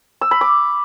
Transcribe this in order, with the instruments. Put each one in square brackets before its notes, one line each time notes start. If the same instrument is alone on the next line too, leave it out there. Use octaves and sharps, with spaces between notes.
[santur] E6
B5
D6